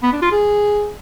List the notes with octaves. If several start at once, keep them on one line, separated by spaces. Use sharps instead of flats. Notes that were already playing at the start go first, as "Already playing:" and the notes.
B3
D4
F4
G#4